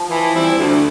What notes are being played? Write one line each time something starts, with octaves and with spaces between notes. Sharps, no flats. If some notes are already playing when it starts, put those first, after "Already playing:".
Already playing: F3
E3
G3 C4 E4
D2